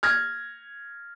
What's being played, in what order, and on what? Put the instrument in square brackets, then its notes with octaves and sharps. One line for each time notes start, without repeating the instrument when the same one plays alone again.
[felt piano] F6 G#6 A#6